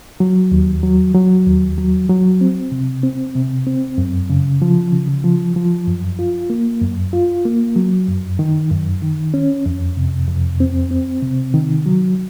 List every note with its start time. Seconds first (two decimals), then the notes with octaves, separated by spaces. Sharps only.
0.20 F#3
0.52 D#2
0.83 F#3
1.14 F#3
1.46 D#2
1.78 F#3
2.09 F#3
2.41 C4
2.72 C3
3.03 C4
3.35 C3
3.67 C4
3.98 F#2
4.30 C#3
4.62 F3
4.93 C#3
5.24 F3
5.56 F3
5.87 F#2
6.19 F4
6.50 A#3
6.82 F#2
7.13 F4
7.45 A#3
7.76 F#3
8.08 F#2
8.39 D#3
8.71 F#2
9.02 D#3
9.34 C#4
9.66 F2
9.97 C3
10.28 F2
10.60 C4
10.91 C4
11.23 C3
11.54 D#3
11.86 F#3